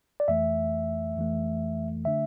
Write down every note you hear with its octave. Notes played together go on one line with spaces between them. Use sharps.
D5
F2 E3 A3 E5
F2 E3 A3
D3 A3 D4 E5